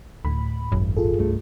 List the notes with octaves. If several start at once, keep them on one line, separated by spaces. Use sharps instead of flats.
D2 A2 B5
D#1 G#1 F#2
F4 G#4 A4
C2 G2 A3